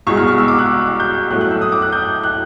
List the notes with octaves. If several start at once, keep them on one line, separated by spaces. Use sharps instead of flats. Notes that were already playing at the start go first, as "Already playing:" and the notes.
C2 B2 G#3 C#6
F6
F6
E6
D6
F#6
G6
A2 F#3 A3 F#6
F#6
E6
D#6
D6
F#6
G6
F#6